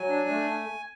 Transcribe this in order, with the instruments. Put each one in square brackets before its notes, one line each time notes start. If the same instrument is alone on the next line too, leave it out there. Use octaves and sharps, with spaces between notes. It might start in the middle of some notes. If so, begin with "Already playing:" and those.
Already playing: [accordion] F#3 G#5
D4
A3